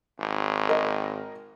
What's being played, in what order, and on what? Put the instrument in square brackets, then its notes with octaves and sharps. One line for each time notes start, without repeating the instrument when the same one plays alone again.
[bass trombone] G#1
[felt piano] A#4 D#5